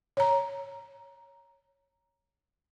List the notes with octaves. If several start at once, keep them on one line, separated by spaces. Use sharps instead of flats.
C#5 A#5